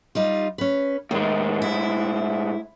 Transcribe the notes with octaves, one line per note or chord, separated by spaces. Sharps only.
G3 D#4 F4
C#4 B4
D#2 A2 G#3
E4